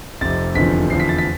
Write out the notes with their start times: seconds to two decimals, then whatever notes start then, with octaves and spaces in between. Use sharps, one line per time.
0.21 F1 F2 C3 A6
0.55 F1 E2 D3 F3 B6
0.90 F1 E2 D3 F3 C7
1.00 B6
1.09 A6
1.18 B6